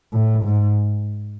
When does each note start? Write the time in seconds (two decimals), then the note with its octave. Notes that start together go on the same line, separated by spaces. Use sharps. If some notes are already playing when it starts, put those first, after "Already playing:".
0.13 A2
0.44 G#2